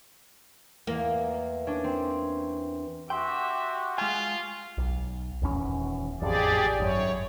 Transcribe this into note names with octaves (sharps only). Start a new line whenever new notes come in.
E2 A#3
C#4 D4
C4
F#4 G4 E5 F#5 G5 C6
G#3 F4 G#5
B1
D#1 E2 C#4
A1 F2 G4 G#4 D5
G#1 F#2 C#5